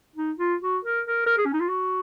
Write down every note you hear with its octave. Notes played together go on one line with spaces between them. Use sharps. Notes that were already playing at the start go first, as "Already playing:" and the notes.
D#4
F4
F#4
A#4
A#4
A#4
G#4
C#4
D#4
F4
F#4